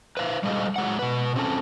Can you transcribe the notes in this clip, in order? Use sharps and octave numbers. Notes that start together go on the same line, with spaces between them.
B4 C5 E5 F5
G3 G#3 A4 C5 D#5 F5
F#3 G#3 F#5
B2 B4
C4 C#4 A4